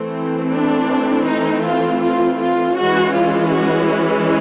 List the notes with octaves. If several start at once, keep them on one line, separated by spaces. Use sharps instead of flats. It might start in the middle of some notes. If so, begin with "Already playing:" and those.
Already playing: E3 A3 C4
D4
D#4
F4
F4
F4
E3 G#3 C#4 F#4
F4
F#4